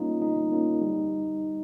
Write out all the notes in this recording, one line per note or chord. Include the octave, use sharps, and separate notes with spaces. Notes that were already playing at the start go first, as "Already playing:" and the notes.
Already playing: G3 A#3 C#4 D#4 F4
G3 D#4
A#3 C#4 F4
G3